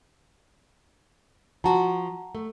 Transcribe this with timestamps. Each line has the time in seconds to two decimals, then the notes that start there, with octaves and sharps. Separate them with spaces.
1.64 F3 F#4 F#5 A5 A#5
2.35 A3